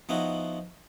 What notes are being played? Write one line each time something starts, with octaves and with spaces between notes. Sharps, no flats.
F3 B3 D#4 E4 F#4